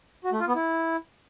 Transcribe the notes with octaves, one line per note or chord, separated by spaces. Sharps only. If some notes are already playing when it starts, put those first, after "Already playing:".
F#4
A3
F4
B3
E4